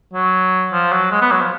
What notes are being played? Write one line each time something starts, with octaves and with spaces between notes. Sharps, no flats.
F#3
F3
F#3
G#3
B3
F#3
F3